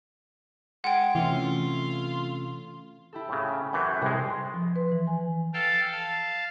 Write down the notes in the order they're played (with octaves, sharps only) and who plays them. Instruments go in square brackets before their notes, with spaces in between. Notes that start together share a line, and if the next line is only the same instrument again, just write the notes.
[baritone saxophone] G#3 [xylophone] F#5 G5
[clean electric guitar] C3 A3 C#4 [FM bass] E3 [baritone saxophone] F4
[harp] E4 G4 A4
[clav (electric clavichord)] A2 C#3
[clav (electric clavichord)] F#2 E3 [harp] C#6 F#6 G6
[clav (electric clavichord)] C2 G#3 [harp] C3 G3
[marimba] C6
F3
B4
E3
G#5
[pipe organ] A4 F5 G5 A5
F5 A5